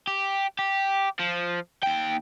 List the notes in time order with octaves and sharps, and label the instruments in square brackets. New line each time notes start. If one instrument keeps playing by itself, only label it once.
[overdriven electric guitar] G4
G4
F3
D#2 G5